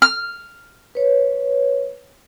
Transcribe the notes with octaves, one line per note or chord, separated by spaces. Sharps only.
F6
B4 C#5